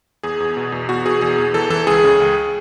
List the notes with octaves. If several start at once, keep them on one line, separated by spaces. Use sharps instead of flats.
E2 G#4
E2
B2
E2
E2 F#4
B2 G#4
E2 G#4
E2
E3 A4
E3 A4
C#2 G#4
C#3
C#2